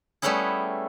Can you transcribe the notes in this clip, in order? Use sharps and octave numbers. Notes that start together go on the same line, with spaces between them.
G3 A3 B3 C#4 E4 G#4